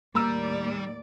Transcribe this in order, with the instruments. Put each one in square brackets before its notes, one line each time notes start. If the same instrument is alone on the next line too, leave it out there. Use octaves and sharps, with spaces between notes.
[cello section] D#2 A2 D5 [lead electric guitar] G3 [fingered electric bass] A#3 [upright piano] A#5 E6